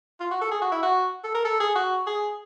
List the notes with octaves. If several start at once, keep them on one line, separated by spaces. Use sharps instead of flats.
F4
F#4
A4
G#4
F#4
E4
F#4
A4
A#4
A4
G#4
F#4
G#4